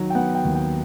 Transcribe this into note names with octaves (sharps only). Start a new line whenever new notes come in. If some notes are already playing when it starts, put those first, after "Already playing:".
Already playing: D#3 F#3
G5
B3 F#5
G5
D#2
G5